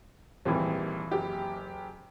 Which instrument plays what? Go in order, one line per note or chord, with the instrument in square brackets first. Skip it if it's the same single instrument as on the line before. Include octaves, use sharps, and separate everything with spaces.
[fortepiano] G#1 E3 [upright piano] D#2 A#2 G3
[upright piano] F#1 G4